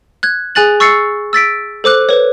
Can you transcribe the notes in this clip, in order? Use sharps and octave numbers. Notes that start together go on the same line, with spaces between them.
F#6 G#6
G#4 G#5 F#6 A6 F#7
C#6 E6 A6 C7 C#7
E6 A6 B6 D7
A4 C5 D6 F#6
B4 C#5